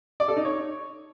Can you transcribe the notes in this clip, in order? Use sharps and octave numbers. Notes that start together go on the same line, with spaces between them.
D5
A4
D#4
C#5